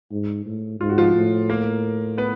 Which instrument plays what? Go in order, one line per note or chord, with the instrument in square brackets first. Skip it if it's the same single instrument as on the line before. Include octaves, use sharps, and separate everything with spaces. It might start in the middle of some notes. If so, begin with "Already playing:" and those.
[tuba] G#2
A2
[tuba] G#2 [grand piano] F4
[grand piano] F#4
F3 F4
[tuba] A2
[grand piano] A#3 A#4
B3 B4